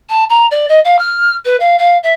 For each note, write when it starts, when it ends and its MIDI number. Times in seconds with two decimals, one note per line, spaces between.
0.09 0.24 81
0.29 0.46 82
0.51 0.68 74
0.68 0.79 75
0.84 0.98 77
0.98 1.34 89
1.45 1.56 71
1.59 1.76 77
1.78 1.97 77
2.03 2.12 76